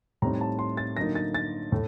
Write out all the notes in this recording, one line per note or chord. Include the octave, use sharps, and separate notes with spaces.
A2 G3 C4 D#4 A#5
A5
C6
A6
D3 F#3 A#3 D#4 A#6
A6
A6
A2 A3